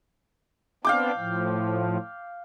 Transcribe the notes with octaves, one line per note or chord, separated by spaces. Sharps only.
B3 C4 D4 F5 G5 D6
A2 F3